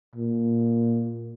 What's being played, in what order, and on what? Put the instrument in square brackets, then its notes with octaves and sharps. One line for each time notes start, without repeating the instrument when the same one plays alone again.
[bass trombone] A#2